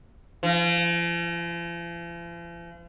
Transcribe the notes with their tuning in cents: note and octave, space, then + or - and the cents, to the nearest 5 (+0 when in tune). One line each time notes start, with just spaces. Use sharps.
F3 -45